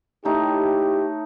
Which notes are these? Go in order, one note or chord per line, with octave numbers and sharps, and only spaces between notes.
A3 D#4 E4 G4 C#5